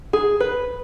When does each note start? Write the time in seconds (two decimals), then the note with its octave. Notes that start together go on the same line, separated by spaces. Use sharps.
0.13 G#4
0.40 B4